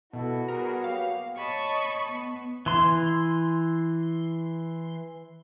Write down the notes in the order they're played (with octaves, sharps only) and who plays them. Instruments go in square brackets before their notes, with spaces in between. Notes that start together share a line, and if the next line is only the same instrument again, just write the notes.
[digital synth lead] B2 [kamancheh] B3 F#4 [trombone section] E4 A4
[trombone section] G3 G#4 B4 [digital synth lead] A#4
[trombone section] F#3 A#3 G4 [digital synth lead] F5
[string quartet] C#5 D#5 A5 B5 C#6
B3
[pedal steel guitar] E3 C6